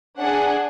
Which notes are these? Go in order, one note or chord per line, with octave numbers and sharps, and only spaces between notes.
D4 G#4 F#5